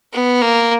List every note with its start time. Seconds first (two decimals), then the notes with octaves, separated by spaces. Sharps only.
0.13 B3
0.41 A#3